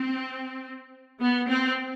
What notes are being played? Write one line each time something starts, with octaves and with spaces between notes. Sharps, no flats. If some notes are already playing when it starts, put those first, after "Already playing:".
Already playing: C4
B3
C4